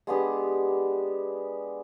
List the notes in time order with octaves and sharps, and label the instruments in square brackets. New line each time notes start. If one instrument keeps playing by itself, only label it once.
[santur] G#3 B3 D4 G4